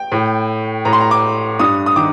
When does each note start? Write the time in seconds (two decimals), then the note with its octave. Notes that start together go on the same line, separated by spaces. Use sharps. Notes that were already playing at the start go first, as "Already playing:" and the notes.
Already playing: G5
0.12 A2
0.85 A2 A#5
0.93 C6
1.01 A#5
1.11 D6
1.59 G2 D#6
1.86 D#6
1.96 D#3 D6